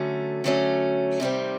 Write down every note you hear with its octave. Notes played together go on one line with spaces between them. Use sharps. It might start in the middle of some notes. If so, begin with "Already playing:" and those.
Already playing: D3 F#3 A3 C#4
D3 F#3 A3 C#4
C3 D#3 G3 C4